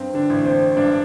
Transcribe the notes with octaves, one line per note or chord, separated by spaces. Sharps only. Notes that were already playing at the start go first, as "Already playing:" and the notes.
Already playing: G2 C4
D3 D4
A1
C4 C5
G2 D4 D5